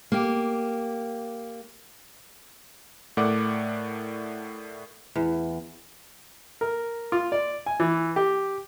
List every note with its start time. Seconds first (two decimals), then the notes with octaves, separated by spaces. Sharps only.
0.12 A#3 G4
3.17 A2 A3 A#4 D5 F#5 D6
5.16 E2
6.61 A#4
7.12 F4
7.32 D5
7.66 G#5
7.80 E3
8.16 G4